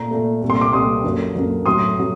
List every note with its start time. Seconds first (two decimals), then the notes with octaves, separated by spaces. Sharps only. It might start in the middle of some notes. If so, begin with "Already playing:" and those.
Already playing: A#2 A3 A#5
0.11 A#2 A3
0.42 C2 A#2 A3
0.50 C6
0.61 D6
0.73 C2 A#2 A3 C6 D#6
1.04 F#2 D3 F#3 A#3
1.35 F#2 D3 F#3 A#3
1.66 A2 F#3 A3 C6 D#6
1.97 A2 F#3